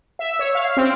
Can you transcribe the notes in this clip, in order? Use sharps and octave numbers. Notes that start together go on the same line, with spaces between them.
E5
C#5
F5
C4